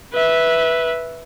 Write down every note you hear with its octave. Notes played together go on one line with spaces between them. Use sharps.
B4 E5